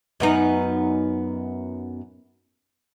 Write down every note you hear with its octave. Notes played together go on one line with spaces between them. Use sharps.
F#2 B3 D#4